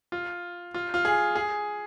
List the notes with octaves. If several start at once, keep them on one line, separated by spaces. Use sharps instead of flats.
F4
F4
F4
G#4
G#4